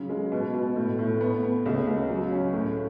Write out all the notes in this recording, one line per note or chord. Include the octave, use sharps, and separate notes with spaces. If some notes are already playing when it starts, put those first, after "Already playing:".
Already playing: C#3 F#3
G#3
B2
B2
A2
A2
B3
B3
C#2
C#2
F#3
C#4
A2